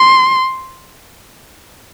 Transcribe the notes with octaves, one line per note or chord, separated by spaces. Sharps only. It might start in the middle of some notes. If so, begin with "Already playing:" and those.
Already playing: C6